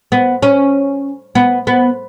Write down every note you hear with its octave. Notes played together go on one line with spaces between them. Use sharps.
B3
C#4
B3
B3